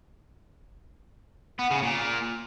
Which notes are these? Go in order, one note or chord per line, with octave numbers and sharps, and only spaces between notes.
B3
C#3
A#2